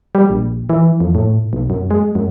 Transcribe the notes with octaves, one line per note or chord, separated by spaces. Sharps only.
G3
A#1
E3
F2
A2
B1
F#2
G#3
F#2